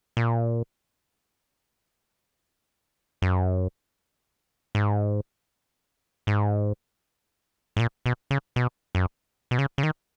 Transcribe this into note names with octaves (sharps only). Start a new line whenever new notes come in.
A#2
F#2
G#2
G#2
G#2
A#2
B2
C#3
B2
F#2
B2
C#3
C#3
D#3